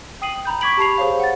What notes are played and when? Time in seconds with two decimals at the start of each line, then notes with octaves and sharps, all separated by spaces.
0.21 G5 D#6 C7 D#7 F#7
0.45 A#5 B5 G6
0.61 C#6 D6 G#6 B6 D7 F#7
0.77 G4 A5 B5 C7 F7
0.98 G#4 C5 C#5 F5
1.20 F#5 A6